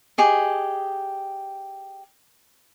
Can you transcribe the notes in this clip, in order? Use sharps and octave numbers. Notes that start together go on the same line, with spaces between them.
G4 G#4 D#5